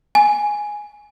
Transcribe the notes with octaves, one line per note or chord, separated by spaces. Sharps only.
G#5